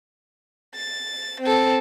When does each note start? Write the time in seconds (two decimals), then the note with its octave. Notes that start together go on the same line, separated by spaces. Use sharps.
0.76 A6
1.41 C4 A4